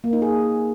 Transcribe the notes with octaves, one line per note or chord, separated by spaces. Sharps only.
A#3
D#4
G#4